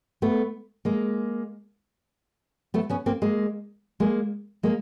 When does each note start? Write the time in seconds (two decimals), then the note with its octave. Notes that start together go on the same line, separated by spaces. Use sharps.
0.22 A3 B3
0.85 G#3 A#3
2.74 A3 B3
2.90 B3 C#4
3.06 A#3 C4
3.22 G#3 A#3
4.00 G#3 A#3
4.63 G#3 A#3